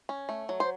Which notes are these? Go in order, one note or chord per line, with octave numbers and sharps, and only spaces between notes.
C#4
A3
F#3
C5